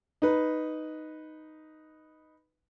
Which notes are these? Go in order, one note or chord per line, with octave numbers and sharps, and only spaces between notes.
D#4 B4